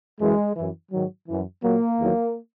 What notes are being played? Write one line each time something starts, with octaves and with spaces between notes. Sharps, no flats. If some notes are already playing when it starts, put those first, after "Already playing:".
F#2 E3 G#3
F#2 E3
G#2 D#3 F#3
F#2 E3
A#2 F#3 A#3
E2 D#3 F#3